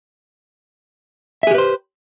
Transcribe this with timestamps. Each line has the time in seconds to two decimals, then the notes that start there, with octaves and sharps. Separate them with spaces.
1.43 E5
1.47 G#4
1.51 G4
1.55 B4
1.58 C5